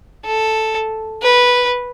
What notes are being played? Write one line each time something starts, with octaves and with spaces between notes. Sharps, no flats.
A4
B4